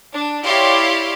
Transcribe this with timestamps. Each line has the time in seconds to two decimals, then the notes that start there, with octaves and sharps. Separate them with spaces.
0.12 D4
0.44 E4 G4 C#5 D5 F5 C6